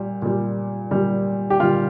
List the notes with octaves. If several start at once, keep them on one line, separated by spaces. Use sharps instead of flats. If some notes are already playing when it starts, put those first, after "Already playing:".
Already playing: A#2 G3
A#2 G3
A#2 G3
G4
A#2 G3 F4